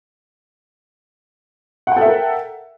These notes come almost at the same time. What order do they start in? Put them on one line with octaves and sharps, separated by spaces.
F#5 G5 A4 E5 A#4